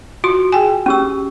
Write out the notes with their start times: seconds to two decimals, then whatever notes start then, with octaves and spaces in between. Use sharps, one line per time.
0.24 F4 F#4 C6
0.52 G#4 G5 G#5
0.86 C#4 G4 E6